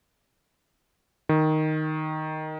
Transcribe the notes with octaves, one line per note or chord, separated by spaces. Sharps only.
D#3